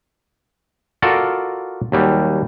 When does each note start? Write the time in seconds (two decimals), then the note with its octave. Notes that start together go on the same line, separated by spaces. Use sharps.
1.02 F4 F#4 A4 A#4 D5 F#5
1.92 D#2 F#3 G3